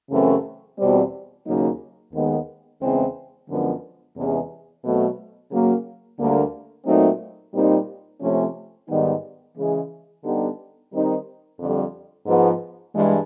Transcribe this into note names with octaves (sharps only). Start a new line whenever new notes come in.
F#2 C#3 E3 A3 C4
E2 B2 G3 C4
D#2 C#3 F#3 A#3 D#4
D#2 D#3 G#3 B3
E2 C#3 E3 G#3 C4
F#2 D3 F3 G#3 B3
E2 C3 E3 G#3 C#4
B2 F#3 A3 C4
C#3 F#3 A#3
D2 D3 G3 A#3
A#2 F#3 A3 C4 D#4
A#2 G3 C4 D#4
C3 F3 A3 C#4
G#2 D#3 G3 B3 D#4
C#3 E3 G#3
D3 G3 B3 D#4 G4
D#3 G3 C4 D#4
F2 D3 G3
G#2 F3 G#3 B3
G2 E3 G#3